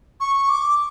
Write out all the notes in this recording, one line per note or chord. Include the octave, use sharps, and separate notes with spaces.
C#6
D6